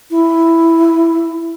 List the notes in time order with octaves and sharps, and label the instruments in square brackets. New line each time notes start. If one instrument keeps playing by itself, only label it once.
[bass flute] E4